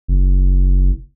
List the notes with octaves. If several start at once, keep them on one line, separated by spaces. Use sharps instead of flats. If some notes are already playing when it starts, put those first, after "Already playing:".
F#1